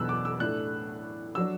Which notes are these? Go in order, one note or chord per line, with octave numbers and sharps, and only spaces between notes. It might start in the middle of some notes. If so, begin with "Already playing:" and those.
Already playing: E2 B2 F#3 B3 D4 E6 F#6
D6
E6
A2 A3 D4 F#6
F#3 D4 E6